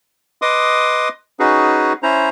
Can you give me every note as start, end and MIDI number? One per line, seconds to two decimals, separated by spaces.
0.42 1.09 71
0.42 1.09 75
0.42 1.09 84
0.42 1.09 86
0.42 1.09 87
1.40 1.93 61
1.40 1.93 63
1.40 1.93 66
1.40 1.93 68
1.40 1.93 71
2.03 2.29 61
2.03 2.29 64
2.03 2.29 72
2.03 2.29 82